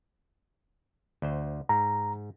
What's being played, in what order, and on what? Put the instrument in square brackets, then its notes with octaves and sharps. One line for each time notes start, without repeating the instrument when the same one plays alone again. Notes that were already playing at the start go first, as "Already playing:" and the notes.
[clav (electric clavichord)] D2 C5
[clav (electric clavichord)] G#2 [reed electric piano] A#5